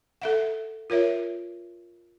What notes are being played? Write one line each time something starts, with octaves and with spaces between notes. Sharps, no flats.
A4 E5 F#5
F4 A#4 C#5 E5